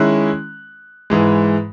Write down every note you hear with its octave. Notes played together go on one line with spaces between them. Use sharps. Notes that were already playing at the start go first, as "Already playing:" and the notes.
Already playing: D#3 G#3 C#4 E4 F#6
G#2 E3 G#3